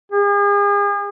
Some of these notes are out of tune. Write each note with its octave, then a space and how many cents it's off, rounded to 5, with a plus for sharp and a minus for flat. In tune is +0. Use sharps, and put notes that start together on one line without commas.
G#4 -40